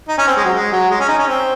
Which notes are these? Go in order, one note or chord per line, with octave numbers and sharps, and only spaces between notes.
D#4
C#4
C4
G#3
F#3
G#3
F#3
G#3
C#4
D#4
C#4
C4